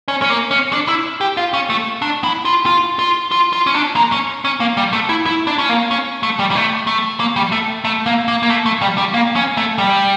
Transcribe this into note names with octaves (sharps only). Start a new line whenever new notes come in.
C#4
C#4
A#3
C#4
D4
E4
G4
F4
C#4
A3
D4
E4
F4
F4
F4
F4
F4
C#4
D4
A#3
C#4
C#4
A#3
G3
A3
E4
E4
D4
C#4
A#3
C#4
A3
G3
G3
A3
A3
A#3
G3
A3
A3
A#3
A#3
A#3
A3
A3
G3
G3
A#3
C#4
A3
G3